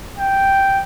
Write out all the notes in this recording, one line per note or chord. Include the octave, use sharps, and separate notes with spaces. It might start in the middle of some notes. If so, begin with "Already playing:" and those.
G5